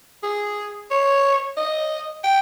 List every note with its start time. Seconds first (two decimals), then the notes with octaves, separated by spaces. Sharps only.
0.24 G#4
0.91 C#5
1.57 D#5
2.24 G5